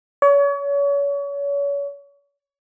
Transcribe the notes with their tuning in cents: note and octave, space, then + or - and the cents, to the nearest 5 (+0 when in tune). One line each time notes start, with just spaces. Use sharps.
C#5 +35